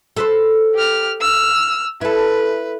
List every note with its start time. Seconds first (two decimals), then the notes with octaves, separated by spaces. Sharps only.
0.17 A4 B4 C5
0.75 G4 F6
1.21 E6 F6
2.01 E4 A4 B4